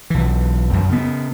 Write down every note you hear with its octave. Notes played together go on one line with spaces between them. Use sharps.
B1 E3
F#2
C#3 B3